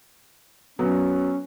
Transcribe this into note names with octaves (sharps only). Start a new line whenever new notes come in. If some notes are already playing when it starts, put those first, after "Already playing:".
F#3 B3 C#4